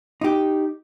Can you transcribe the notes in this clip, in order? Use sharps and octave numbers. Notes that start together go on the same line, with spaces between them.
D#4 G4